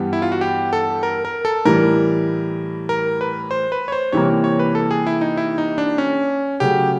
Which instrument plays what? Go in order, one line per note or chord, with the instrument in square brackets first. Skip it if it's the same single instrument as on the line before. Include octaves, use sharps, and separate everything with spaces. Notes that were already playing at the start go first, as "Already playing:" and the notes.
Already playing: [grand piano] G2 E3 G3 B3 [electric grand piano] G4
[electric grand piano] E4
F4
F#4
G4
A4
A#4
A#4
A4
[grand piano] A2 E3 G3 [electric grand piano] A#4
[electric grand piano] A#4
B4
C5
B4
C#5
C5
[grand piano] C3 E3 G3 A#3 [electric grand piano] C#5
[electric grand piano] C#5
B4
A4
G#4
E4
D#4
E4
D#4
D4
C#4
[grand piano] C#3 F#3 A3 [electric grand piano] G4